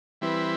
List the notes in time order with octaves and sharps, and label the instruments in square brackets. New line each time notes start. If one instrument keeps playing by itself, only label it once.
[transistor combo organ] E3 G3 C4 E4 B4